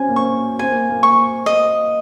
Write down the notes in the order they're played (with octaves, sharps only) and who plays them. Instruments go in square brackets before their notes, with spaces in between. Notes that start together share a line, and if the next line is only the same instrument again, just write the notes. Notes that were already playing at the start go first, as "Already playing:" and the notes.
Already playing: [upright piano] C4 C#4 [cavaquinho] G#5
[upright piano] A#3
[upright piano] C4 [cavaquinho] C#6
[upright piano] C4 [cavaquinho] G#5
[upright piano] A#3
A#3
[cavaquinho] C#6
D#5